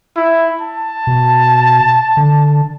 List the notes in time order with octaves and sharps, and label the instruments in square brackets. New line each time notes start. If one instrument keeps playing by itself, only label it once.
[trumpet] E4
A5
[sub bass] B2
D3